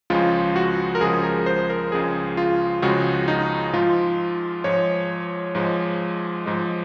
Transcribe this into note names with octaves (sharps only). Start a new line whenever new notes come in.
C#2 C#3 F3 G#3 F4
F#4
A#4
C#2 C#3 F3 G#3 G#4
A#4
C5
A#4
C#2 C#3 F3 G#3 G#4
F4
C#2 C#3 F3 G#3 F#4
D#4
G#2 F3 G#3 F4
G#2 F3 G#3 C#5
G#2 F3 G#3
G#2 F3 G#3